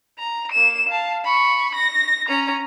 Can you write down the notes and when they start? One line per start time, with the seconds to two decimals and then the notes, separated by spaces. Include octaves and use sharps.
0.19 A#5
0.52 A#3 E7
0.89 F5 A5
1.25 B5 C#6
1.75 A#6
2.28 C#4 A#5